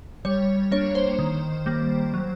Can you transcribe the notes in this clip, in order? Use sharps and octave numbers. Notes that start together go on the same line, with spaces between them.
G3 C#5
A#3 D4 C#5
C5
D#3
G3 A#3
F#3